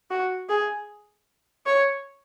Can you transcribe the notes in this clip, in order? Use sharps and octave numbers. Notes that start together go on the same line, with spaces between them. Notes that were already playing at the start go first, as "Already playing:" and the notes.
F#4
G#4
C#5